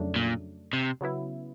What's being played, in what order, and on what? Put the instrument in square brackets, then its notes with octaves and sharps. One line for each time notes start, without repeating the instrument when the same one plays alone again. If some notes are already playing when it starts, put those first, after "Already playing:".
Already playing: [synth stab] F2 C#3 F#3 A3 D4
[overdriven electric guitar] A#2
C3
[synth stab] C#3 F#3 B3 E4